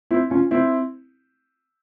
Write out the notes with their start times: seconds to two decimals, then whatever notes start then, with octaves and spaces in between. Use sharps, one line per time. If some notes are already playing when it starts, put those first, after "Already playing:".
0.11 C4 E4
0.30 C#4 F4
0.51 C4 E4